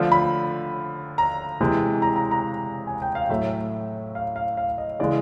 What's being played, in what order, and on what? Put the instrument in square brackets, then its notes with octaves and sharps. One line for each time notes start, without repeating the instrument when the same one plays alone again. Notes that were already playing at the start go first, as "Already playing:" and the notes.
Already playing: [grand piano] D3 F3 A3
B5
A#5
C3 E3 G#3
A#5
A#5
A#5
G#5
G5
F5
A2 F#3 A3 E5
F5
F5
F5
D#5
C#3 E3 G#3 D5